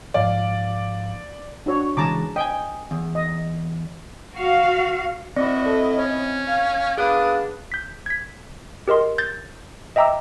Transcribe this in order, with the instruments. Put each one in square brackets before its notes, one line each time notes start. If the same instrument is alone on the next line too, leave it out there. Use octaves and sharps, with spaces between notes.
[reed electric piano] G#2 F3 F5 [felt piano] D5
[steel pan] D4 F#4 C#5
[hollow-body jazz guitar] C#3 E3 G#3 [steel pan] A5 A#5 D6
[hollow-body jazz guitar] D#5 G#5 [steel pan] G5
[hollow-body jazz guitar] E2
[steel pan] D#5
[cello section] F#4 F5
[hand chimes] C4 [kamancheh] E4 D#5 [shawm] F#4 [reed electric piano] D5
[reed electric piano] A4
[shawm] C#4 [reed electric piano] C#5
[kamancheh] F5
[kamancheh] B3 D#6 [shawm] D4 [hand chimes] G#4 F5 F#6
[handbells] G6 B6
G#6 B6
G4 A#4 D#5 C6
G6 A6
D#5 E5 G5 A#5 D6 E6